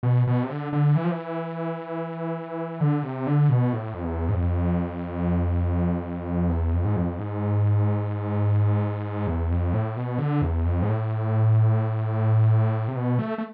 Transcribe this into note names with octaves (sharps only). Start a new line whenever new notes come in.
B2
B2
C3
D3
D3
E3
F3
E3
D3
C3
D3
B2
A2
F2
E2
G#2
F2
E2
F2
G#2
F2
G#2
E2
F2
A2
B2
D3
E2
F2
G#2
A2
C3
B2
A3
A3